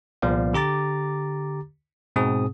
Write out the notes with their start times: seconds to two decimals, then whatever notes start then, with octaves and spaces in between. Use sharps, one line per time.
0.22 C2 A#2 F3 B3 D5 F5
0.53 D3 G4 A#5 D6 A6
2.16 G#2 B2 C4 G#4 D#6